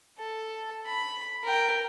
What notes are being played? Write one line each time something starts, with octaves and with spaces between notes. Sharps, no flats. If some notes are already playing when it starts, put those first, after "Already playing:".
A4
B5
A#4 G5